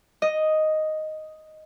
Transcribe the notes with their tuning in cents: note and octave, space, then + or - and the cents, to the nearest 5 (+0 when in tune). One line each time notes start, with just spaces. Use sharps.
D#5 +0